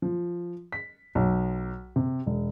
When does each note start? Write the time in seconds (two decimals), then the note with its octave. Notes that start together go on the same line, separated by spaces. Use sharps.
0.02 F3
0.72 B6
1.15 B1
1.96 C3
2.26 E1